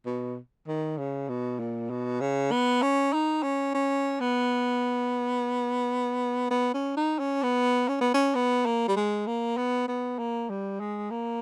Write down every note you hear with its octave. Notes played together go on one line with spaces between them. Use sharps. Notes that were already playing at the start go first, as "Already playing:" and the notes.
B2
D#3
C#3
B2
A#2
B2
C#3
B3
C#4
D#4
C#4
C#4
B3
B3
C#4
D#4
C#4
B3
C#4
B3
C#4
B3
A#3
G3
G#3
A#3
B3
B3
A#3
G3
G#3
A#3